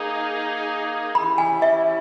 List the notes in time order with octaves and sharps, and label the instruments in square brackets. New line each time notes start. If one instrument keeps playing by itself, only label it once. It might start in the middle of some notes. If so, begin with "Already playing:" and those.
Already playing: [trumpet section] A#3 D#4 G#4
[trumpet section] C#4 E4 G4 [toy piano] B5
[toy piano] G#5
E5